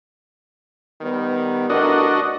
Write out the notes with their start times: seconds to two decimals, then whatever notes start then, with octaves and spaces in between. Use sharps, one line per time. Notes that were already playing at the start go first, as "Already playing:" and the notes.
1.01 D#3 G3 B3
1.70 A1 D4 F#4 A#4 D#5